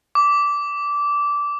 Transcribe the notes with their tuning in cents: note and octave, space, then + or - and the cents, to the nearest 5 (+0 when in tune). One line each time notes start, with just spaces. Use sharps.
D6 -15